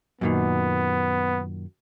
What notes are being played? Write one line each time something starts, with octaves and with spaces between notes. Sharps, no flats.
F#2 A#2 D#3 B3